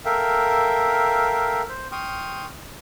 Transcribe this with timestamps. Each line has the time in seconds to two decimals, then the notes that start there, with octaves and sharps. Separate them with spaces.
0.05 A4 A#4 E5 F5 G5
1.69 C5
1.92 G5 C6 C#6 D#6 F6